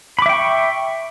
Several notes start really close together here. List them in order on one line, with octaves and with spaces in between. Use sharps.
B5 D6 E5 G5 C#6